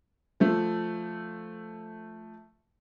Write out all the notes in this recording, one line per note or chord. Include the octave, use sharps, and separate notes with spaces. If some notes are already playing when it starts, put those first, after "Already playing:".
F3 A3